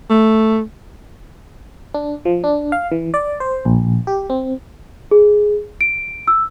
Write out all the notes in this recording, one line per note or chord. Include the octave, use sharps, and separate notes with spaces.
A3
D4
F3
D4
F5
E3
D5
C5
A#1
G4
C4
G#4
D7
E6